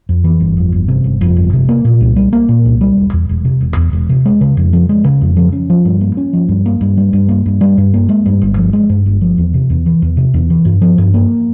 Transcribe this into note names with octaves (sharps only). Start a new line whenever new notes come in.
F2
E3
G1
F2
G1
C3
G1
F2
G1
C3
A#3
A#2
C2
G3
A#3
A#2
C2
G3
E1
E2
E1
C3
E1
E2
E1
C3
G#3
C#3
F2
F3
G#3
C#3
F2
F3
C#4
F3
G2
A#3
C#4
F3
G2
A#3
G2
G3
G2
A#3
G2
G3
G2
A#3
G#3
G2
G1
F3
G#3
G2
G1
F3
E2
C3
E2
E3
E2
C3
E2
E3
G2
F3
G2
A#3